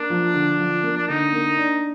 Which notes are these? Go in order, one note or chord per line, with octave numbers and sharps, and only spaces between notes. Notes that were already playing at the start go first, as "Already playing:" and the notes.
Already playing: A#3 D4
F3
D3
F3
A#3
D4
D3 D#4
A#3
D4